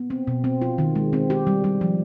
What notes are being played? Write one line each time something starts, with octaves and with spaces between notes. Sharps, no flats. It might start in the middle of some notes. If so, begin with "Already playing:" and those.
Already playing: B3
C4
B2
C4
F4
D#3
G#3
C4
G4
G3
G3
F3